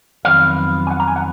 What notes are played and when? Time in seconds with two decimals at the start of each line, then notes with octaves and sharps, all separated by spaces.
0.25 F2 D#3 F#3 B3 F5
0.87 G#5
0.91 F#5
1.00 A#5
1.08 G#5
1.16 F#5